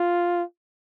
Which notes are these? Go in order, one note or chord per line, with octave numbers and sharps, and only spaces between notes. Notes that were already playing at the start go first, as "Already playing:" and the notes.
Already playing: F4